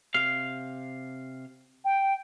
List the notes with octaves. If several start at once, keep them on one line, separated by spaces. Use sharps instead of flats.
C3 F5
G5